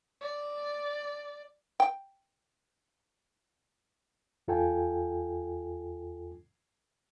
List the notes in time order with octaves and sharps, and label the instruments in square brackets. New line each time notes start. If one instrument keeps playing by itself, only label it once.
[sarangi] D5
[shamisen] G5
[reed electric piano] E2 F4 A4 G5 G#5